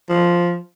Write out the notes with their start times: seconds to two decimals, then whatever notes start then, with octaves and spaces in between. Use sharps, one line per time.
0.09 F3